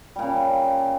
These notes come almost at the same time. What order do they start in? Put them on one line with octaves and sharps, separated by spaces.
G3 A#2 C#3